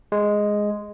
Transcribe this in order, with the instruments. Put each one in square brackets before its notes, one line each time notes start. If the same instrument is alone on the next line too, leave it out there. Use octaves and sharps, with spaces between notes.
[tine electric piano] G#3